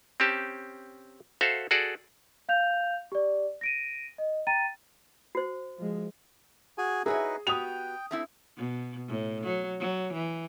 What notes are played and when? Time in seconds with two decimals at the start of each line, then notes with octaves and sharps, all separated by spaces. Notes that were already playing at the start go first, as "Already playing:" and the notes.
0.20 C4 C#4 G4 A5
1.41 F#4 A4 C5 E5 F5
1.71 F#4 G#4 A4 D5
2.49 F5 G6 F7
3.12 G4 D5
3.61 A#6 D7 D#7
4.18 D#5
4.47 G5 A#5 A6 D#7
5.35 F#4 C5
5.78 F3 G#3
6.78 F#4 G#4 G#5
7.06 D#4 E4 F#4 G#4 B4 C#5 D#5
7.47 B3 F#4 G4 G5 D#6 F7
8.11 A3 C4 E4
8.57 B2
9.08 A2
9.44 F#3
9.80 F#3
10.13 E3